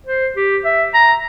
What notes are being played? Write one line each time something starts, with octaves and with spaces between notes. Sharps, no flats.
C5
G4
E5
A#5